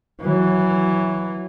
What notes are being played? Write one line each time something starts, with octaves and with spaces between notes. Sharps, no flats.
E3 F#3